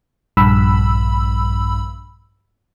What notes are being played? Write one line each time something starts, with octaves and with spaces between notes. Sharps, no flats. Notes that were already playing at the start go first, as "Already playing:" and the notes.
A#1 G2 B5 E6